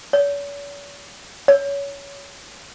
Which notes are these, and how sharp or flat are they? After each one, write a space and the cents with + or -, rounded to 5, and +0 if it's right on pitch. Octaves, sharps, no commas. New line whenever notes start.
C#5 +45
C#5 +20